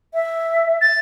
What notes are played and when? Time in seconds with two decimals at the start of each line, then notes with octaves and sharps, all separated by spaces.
0.14 E5
0.81 A6